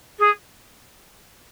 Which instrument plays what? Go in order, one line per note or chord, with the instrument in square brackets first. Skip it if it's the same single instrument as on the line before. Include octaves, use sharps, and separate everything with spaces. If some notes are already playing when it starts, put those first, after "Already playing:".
[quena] G#4